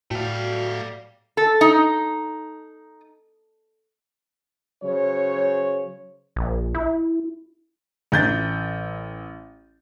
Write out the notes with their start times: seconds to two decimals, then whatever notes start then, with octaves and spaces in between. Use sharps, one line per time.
0.11 A2 A3 F#4 D5 F5 G5
1.37 A4
1.61 D#4
4.83 C#3 F#3 C5 C#5
6.36 A#1
6.75 E4
8.12 A1 G6 A6